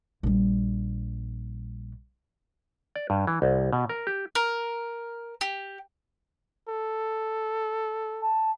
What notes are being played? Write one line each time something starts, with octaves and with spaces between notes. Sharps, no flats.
A#1 G3
D5
G2
E3
C2
B2
A#4
G4
A#4
G4
A4
A5